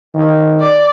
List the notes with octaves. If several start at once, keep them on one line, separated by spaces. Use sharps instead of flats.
D#3
D5